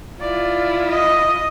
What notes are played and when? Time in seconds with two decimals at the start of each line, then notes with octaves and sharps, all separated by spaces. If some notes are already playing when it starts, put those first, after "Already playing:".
0.20 E4 F4 D5
0.89 D#5